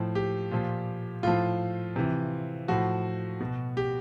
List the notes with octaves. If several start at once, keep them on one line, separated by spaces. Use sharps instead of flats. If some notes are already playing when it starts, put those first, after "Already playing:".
Already playing: A2 F3
G4
A#2 F3
A2 F3 F4
C3 E3
A2 F3 F#4
B2
G4